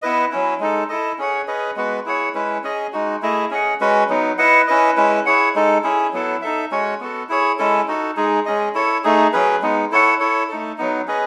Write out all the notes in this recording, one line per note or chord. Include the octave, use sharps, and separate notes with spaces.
B3 E4 B4 D#5
F#3 C#4 E4
G#3 D#4 A4
E4 A4 D#5
C#4 G#4 C#5 F#5
C#4 G#4 B4 D#5
G#3 B3 F#4 B4
E4 G#4 C#5 F#5
G#3 C#4 E4 B4
C#4 G#4 D#5
G#3 D#4 F#4
A3 E4 G#4 D#5
C#4 G#4 D#5 F#5
G#3 C#4 F#4 B4
F#3 B3 D#4
E4 B4 D#5 F#5
C#4 E4 B4 D#5
G#3 C#4 E4 B4
E4 G#4 C#5 F#5
G#3 D#4 A4
C#4 E4 G#4
F#3 B3 E4 A4
D#4 A4 E5
G#3 C#4 F#4 C#5
B3 F#4 A4
E4 G#4 C#5
G#3 C#4 E4 A4
D#4 F#4 A4
G#3 D#4 G#4
G#3 C#4 G#4 D#5
E4 A4 C#5
A3 D#4 G#4
F#3 C#4 G#4 B4
G#3 B3 D#4
E4 A4 C#5 F#5
E4 A4 C#5
A3 D#4 A4
F#3 B3 D#4
C#4 G#4 B4 D#5